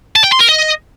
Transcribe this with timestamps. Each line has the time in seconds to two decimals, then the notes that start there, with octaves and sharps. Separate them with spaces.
0.16 A5
0.24 G5
0.32 C6
0.40 A#4
0.48 D#5